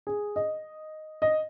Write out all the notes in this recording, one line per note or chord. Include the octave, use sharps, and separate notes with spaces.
G#4
D#5
D#5